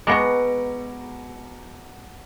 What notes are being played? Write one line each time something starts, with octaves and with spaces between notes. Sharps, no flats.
B2 G#3 B3 F#4 A#5 D6 A#6 C#7